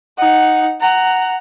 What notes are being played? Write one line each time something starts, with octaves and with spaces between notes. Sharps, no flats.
D#4 F#5
F#5 A#5